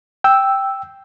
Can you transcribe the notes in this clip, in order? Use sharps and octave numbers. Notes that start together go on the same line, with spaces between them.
G5 E6